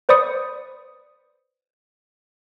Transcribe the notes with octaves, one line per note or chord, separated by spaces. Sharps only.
B4 C5 D5 B5 D#6 C#7